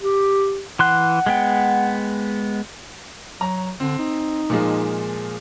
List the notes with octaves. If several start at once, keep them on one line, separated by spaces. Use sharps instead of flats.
G4
E3 F#5 C6 F#6
G#3 B3 G5
F#3 A#5
D3 C4
D#4
A#2 F3 G#3